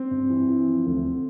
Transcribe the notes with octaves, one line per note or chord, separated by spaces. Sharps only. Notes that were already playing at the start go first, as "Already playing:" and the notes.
Already playing: C4
G2
E3
E3
F3
D2